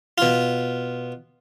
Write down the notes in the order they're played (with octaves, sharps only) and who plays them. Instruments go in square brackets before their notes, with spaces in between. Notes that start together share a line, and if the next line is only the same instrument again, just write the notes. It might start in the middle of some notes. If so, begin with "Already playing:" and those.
[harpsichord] B2 F4